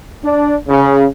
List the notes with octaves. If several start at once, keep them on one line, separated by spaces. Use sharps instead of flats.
D4
C#3